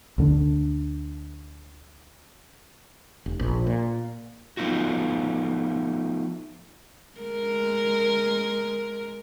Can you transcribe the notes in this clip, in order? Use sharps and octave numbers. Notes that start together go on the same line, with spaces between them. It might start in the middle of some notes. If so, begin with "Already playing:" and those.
D2 D3 D4
F1
A#1
A#2
F3 A3 B3 D#4 F4 F#4
G#3 A#4